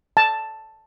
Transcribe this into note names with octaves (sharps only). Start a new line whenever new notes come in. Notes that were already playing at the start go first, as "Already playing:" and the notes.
A5